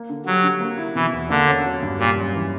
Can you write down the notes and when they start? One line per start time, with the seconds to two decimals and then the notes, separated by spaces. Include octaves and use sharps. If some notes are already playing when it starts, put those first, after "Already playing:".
Already playing: A#3
0.09 D3
0.26 F#3 G3
0.44 D3
0.60 A#3
0.78 E4
0.95 B2 E3
1.13 E2
1.30 D3 A#3
1.48 C#4
1.65 F#3
1.83 G2
1.99 A#2 G3
2.17 F#2
2.34 E3